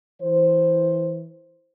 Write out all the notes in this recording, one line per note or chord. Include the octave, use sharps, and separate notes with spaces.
E3 C5